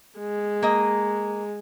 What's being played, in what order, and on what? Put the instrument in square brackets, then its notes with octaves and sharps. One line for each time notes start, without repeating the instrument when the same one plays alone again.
[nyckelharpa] G#3
[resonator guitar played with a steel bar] A#3 D#5